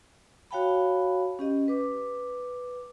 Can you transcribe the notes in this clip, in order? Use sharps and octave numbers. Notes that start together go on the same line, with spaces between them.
F#4 C#5 F5 G5 A5 B5
C#4 G4 D#5
B4 D6